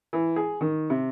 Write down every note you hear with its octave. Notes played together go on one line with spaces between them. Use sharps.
E3
G#4
D#3
C3